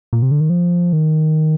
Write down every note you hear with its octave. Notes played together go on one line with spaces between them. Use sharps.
A#2
C3
D3
D#3
F3
D#3